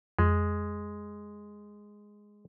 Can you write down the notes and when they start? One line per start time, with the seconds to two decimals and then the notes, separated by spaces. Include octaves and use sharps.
0.19 F2 G#3